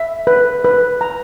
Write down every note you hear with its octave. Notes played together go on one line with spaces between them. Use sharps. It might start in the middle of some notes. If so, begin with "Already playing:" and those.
Already playing: E5
B4
B4
A#5